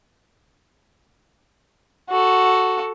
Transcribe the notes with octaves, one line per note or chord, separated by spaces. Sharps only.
F#4 A4